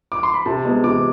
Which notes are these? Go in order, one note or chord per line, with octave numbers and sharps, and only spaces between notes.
D6
C6
B5
C3 A5
G#3 B3
C3 D6